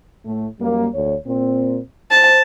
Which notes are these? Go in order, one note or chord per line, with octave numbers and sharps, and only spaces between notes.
A2 A3
F#2 G3 A#3
D2 C#5
A#2 C4
C5 A5